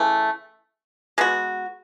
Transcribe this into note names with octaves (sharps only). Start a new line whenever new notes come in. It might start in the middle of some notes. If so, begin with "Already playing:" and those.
Already playing: C#3 E3 A3
G#3 B3 F#4